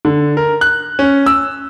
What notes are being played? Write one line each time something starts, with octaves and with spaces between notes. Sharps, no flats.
D3
A#4
F#6
C#4
E6